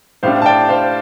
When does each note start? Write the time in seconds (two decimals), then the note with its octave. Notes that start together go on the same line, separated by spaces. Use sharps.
0.23 A2 G3 D4 C5 F5
0.42 A5
0.46 D5 G5
0.69 C5 F5